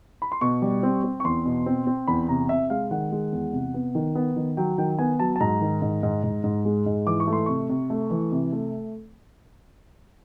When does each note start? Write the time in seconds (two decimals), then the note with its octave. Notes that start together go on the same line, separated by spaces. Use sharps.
0.22 B5
0.32 C6
0.41 B2 C#6
0.62 G3
0.83 C4
1.04 C4
1.20 C#6
1.24 E2 C6
1.46 B2
1.66 C4
1.87 C4
2.07 E2 B5
2.28 C3 A#5
2.49 C3 E5
2.70 G#3 F5
2.91 D#3 F#5
3.12 G#3
3.32 E2
3.53 C3
3.74 B3
3.95 D#3
4.15 B3
4.36 D#3
4.57 F#3 G5
4.78 D#3 G5
4.99 B3 G#5
5.19 F#3 A5
5.36 A5
5.40 G#2 A#5
5.61 D#3
5.82 G#2
6.03 G#2
6.23 G#2
6.44 G#2
6.65 G#3
6.86 G#2
7.06 E3 D6
7.20 C#6
7.27 A3
7.33 C6
7.46 C3 C#6
7.69 C3
7.90 A3
8.10 E3
8.32 C3
8.52 A3